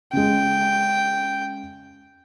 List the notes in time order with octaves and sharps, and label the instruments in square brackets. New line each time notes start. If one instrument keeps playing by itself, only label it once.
[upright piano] C#3 G#3 [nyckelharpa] G5